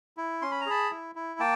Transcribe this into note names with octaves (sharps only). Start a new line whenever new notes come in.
E4
C#4 C6
B5
A#5
G#4 A5 B5
E4
E4
A#3 G5 A5